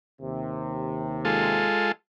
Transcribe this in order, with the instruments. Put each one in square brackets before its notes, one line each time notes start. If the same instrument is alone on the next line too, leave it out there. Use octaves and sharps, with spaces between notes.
[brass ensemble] D#2 C3
[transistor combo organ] G#3 F4 A4